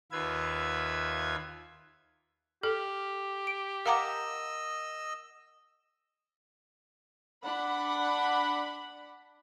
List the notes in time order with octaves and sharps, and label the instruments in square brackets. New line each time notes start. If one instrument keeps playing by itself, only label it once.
[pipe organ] D#2 F4 B4 E5 G#6
[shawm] G4 [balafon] A4
[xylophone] D7
[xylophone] A#4 F#5 A5 [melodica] D#5 E6 [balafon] F5 A#5 D6
[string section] D4 F#5 B5